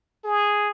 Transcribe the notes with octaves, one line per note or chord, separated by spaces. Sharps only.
G#4